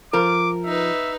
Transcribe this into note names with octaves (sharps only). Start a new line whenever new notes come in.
F3 A#4 D6
D#4 B4 E5